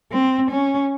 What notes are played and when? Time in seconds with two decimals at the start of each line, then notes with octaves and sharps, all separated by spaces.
0.12 C4
0.51 C#4